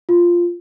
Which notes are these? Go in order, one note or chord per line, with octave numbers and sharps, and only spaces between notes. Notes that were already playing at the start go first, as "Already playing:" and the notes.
F4